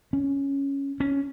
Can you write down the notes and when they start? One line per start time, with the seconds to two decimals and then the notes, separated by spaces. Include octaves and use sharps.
0.13 C#4
1.00 C#4